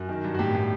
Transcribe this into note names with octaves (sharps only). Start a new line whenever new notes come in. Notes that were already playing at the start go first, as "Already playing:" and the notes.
Already playing: F#2 F#4
D#3
G2
F#4
A2 G4
A2